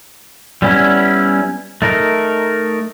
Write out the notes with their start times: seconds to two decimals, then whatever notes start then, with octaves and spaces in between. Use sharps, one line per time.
0.62 G3 B3 C#4 E4
1.82 A3 D#4 A#4